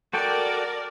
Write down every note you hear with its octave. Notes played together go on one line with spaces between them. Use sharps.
F#4 A4 A#4 D5 G5